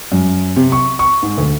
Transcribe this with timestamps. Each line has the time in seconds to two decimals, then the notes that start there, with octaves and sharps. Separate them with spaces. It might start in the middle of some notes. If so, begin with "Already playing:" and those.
0.12 F#2
0.56 C3
0.72 C#6
0.99 C#6
1.22 G#2
1.38 D2